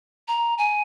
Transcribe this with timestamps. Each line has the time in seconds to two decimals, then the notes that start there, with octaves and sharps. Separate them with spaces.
0.28 A#5
0.58 G#5